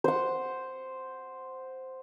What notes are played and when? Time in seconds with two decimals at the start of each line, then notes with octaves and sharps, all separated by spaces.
0.04 C5 F#5